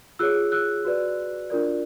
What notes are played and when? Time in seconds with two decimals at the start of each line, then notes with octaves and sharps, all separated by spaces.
0.19 F4 G#4 C#5 E6 F#6
0.52 E6 F#6
0.85 F#4 B4 D5
1.50 D4 F4 A#4 D5